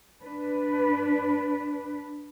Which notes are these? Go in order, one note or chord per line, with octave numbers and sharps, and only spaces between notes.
D4 B4